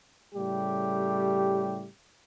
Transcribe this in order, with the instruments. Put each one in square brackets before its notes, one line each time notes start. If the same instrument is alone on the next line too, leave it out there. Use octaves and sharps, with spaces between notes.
[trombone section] A2 C#3 G3 A3 G4